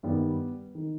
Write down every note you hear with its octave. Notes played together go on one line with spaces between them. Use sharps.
G2 D#3 G3 B3
D#3